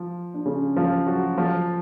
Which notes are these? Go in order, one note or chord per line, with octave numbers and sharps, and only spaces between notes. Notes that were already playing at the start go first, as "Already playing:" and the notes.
Already playing: F3 F4
D4
C#3 C#4
F3 F4
F#3 F#4
F3 F4